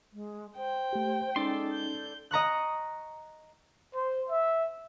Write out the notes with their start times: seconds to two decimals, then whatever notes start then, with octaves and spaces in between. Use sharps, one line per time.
0.13 G#3
0.57 C5 G5
0.93 A3 G4
1.36 G#3 C#4 D#4 A4 D5 C6
1.72 G6
2.31 D#5 A#5 C#6 F#6
3.93 C5
4.28 E5